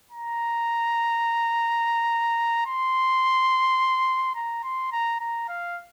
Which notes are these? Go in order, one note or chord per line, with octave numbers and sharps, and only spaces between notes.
A#5
C6
A#5
C6
A#5
A#5
F5